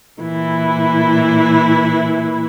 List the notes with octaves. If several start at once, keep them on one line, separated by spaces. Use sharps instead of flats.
A#2 E3 E4